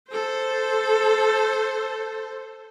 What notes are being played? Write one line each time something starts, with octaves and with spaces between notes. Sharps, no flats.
A4 C5